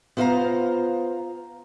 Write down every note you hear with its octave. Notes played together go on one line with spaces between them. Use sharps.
B3 F4 C5 D5 F5 A#5